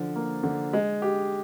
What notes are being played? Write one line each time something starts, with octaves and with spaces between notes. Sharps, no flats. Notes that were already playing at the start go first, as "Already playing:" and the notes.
Already playing: D3 F3
A#3
D3
G#3
G4